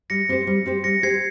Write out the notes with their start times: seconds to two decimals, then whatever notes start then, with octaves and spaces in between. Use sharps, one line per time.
0.10 G3 A#6 C#7
0.29 C4 G4 C5
0.47 G3
0.66 C4 G4 C5
0.84 G3 A#6 C#7
1.03 C4 G4 C5 G#6 C7